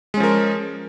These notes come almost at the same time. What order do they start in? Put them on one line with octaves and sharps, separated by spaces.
G#3 C#4 F3 A#4